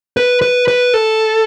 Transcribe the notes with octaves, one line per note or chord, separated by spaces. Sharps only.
B4
B4
B4
A4